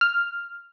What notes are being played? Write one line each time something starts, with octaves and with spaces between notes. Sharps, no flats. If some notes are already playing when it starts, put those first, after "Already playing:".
F6